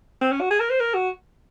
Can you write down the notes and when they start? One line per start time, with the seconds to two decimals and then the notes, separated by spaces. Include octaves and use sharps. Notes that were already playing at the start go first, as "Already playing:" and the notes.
0.22 C4
0.32 C#4
0.41 F#4
0.51 G#4
0.60 A#4
0.70 C5
0.80 A#4
0.95 F#4